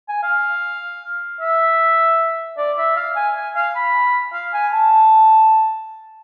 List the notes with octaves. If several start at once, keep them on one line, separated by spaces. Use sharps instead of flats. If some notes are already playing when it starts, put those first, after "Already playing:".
G#5
F5
E5
D5
E5
F5
G#5
G#5
F5
B5
F5
G#5
A5